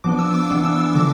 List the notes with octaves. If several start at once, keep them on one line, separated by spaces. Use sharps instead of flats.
F3 B3 D4 D6
E6
D6
E3 B3 D4 D6
E6
E6
D3 F3 D6